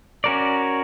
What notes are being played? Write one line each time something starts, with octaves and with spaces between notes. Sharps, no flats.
C#4 F#4 A#4 D5